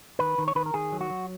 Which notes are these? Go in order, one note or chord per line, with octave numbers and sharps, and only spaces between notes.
D#3 B4
D#3
C#5
D#3 B4
A#4
D#3 G#4
F#3
F#4
F#3